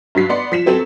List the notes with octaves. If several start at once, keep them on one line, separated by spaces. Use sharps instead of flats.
G2 F#3 B6 C7
B3 D5 C6 C#7
F3 B6 E7
F#3 C4 A4 E7